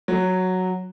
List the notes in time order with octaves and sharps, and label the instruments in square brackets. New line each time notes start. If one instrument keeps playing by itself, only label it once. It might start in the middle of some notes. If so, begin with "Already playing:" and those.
[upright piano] F#3